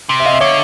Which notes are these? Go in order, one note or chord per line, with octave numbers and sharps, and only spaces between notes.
C3
E5
D#5 F5
E5
D3 C#5 D#5